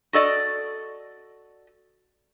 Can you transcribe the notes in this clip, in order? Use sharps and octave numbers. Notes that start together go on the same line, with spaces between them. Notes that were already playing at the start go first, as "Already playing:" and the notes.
F#4 A4 D5 D#5